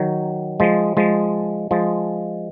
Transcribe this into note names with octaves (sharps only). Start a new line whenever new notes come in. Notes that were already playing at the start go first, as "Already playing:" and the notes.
Already playing: D#3 F#3
F3 G#3
F3 G#3
F3 G#3